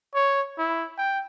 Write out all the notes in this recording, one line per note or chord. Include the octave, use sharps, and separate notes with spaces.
C#5
E4
G5